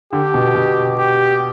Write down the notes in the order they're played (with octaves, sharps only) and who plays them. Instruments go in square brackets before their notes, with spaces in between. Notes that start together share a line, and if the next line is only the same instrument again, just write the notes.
[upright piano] D3 [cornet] G4
[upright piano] B2
B2
[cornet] G4